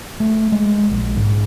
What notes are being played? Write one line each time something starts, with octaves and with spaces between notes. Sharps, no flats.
A3
G#3
A#1
G#2